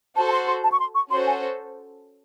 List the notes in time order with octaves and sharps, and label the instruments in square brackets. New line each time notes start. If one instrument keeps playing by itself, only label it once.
[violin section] F#4 A4 C5 [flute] A5
[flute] A5
C6
C6
A5
C#6
C6
C#6
[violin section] C#4 F#4 A4 C5 [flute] C6
[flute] G#5